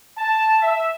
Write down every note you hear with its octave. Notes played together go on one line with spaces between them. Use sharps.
A5
E5